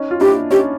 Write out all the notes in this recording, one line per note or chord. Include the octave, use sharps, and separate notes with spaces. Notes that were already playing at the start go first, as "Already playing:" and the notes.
Already playing: C#4 D#4
F4
D4 E4 G4
C#4 D#4 G4